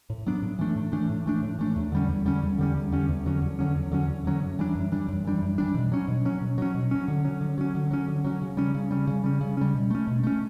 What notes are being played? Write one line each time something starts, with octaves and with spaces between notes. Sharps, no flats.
A2
F#3 B3 D4
A2
E3 A3 D4
A2
E3 A3 D4
A2
E3 A3 D4
A2
E3 A3 D4
E2
D3 G3 C#4
E2
D3 G3 C#4
E2
D3 G3 C#4
E2
D3 G3 C#4
E2
D3 F#3 C#4
E2
D3 F#3 C#4
E2
D3 F#3 C#4
E2
D3 F#3 C#4
F#2
E3 G3 D4
F#2
E3 G3 D4
F#2
E3 G3 D4
F#2
E3 G3 D4
B2
F#3 C#4
B2
F#3 C#4
B2
F#3 C#4
B2
F#3 C#4
D3
F#3 C#4
D3
F#3 C#4
D3
F#3 C#4
D3
F#3 C#4
C#3
G3 C#4
C#3
G3 C#4
C#3
G3 C#4
C#3
G3 C#4
B2
A3 C#4
B2
A3 C#4